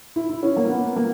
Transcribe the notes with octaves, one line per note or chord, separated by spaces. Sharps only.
E4
E4
C#4
A#3
B3
A#3